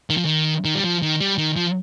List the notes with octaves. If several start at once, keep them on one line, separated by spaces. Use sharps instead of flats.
D#3
F3
D#3
D#3
G3
F3
D#3
G3
D#3
F3